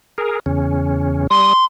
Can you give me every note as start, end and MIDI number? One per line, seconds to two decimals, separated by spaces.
0.18 0.39 68
0.18 0.39 70
0.46 1.27 40
0.46 1.27 49
0.46 1.27 61
1.30 1.53 55
1.30 1.65 84
1.30 1.53 87